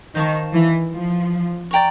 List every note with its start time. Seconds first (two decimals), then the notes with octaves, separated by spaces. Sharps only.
0.15 D#3 C5 F5 A5 C#6
0.54 E3
0.93 F3
1.71 D5 G5 A#5 C#6